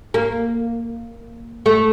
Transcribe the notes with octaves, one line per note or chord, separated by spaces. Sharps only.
A#3
A3